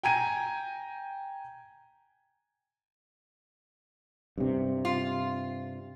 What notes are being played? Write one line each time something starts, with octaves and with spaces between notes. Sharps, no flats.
G5 G#5 A#5 G#6 D#7
G2 C3
F4